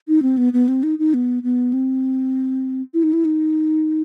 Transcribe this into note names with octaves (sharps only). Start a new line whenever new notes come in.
D#4
C4
B3
B3
C4
D#4
D#4
B3
B3
C4
E4
D#4
E4
D#4